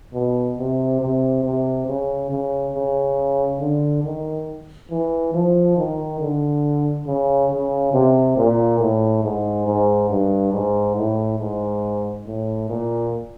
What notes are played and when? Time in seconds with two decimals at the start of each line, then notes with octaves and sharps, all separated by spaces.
0.14 B2
0.58 C3
1.01 C3
1.44 C3
1.87 C#3
2.30 C#3
2.75 C#3
3.60 D3
4.04 D#3
4.91 E3
5.34 F3
5.77 D#3
6.21 D3
7.07 C#3
7.51 C#3
7.93 C3
8.37 A#2
8.80 A2
9.24 G#2
9.67 G#2
10.10 G2
10.53 G#2
10.96 A2
11.40 G#2
12.26 A2
12.69 A#2